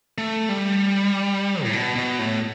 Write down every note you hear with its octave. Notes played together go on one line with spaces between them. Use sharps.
A3
G3
A2
B2
B2
A2